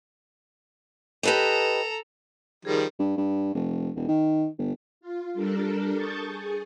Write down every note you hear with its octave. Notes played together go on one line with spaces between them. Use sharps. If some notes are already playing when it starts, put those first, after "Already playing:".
G4 A4 B4 D#5 A#5
D#3 F3 G3 G#4 A#4
G2
G2
F1
E1
D#3
G1
F4
G3 D4 A4 A#4
A5 C#6 D#6 G6 A6
G#4